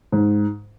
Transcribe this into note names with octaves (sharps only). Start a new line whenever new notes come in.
G#2